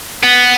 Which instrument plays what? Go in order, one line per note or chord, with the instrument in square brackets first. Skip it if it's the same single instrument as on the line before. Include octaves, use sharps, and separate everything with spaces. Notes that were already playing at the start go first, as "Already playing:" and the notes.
[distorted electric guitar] B3